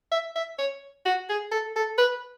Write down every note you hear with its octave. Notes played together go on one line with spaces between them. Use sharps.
E5
E5
C#5
F#4
G#4
A4
A4
B4